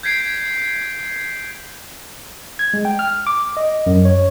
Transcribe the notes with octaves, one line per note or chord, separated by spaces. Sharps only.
G6 G#6 B6 C7 D7
G#6
G#3
G5
F6
D6
D#5
F#2
C#5